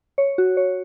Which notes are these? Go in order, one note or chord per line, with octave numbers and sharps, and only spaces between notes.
C#5
F#4
C#5